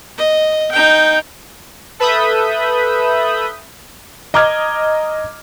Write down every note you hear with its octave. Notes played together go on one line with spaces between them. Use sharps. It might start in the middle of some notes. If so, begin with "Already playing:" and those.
D#5
D#4 G5
A4 B4 E5 B5 D#6 G6
D#5 A#5 D6 F6 G#6